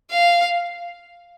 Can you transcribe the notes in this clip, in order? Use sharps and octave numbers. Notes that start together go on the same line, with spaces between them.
F5